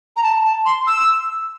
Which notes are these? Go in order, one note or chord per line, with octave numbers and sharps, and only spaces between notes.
A#5
A5
A5
C6
E6